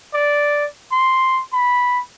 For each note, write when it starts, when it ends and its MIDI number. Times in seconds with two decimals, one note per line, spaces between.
0.14 0.65 74
0.92 1.42 84
1.53 2.00 83